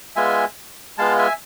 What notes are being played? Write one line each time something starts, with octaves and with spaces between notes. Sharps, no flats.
G#3 B3 F4 E5 G#5
G#3 B3 F4 F5 A5
E5 G#5